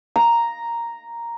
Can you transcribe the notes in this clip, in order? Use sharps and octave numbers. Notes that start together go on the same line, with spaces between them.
A#5